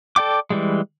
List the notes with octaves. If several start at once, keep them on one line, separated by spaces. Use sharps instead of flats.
A4 D5 G5 D6
E3 G3 G#3